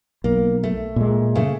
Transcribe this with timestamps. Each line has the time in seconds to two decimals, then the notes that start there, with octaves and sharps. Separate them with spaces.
0.24 B1 A#3
0.63 A3
0.96 A#2 G#3
1.35 C#3 A3